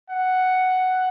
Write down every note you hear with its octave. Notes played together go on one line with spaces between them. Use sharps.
F#5